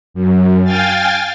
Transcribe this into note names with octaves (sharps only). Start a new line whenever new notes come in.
F#2
F5 G5 G#5 F6 A6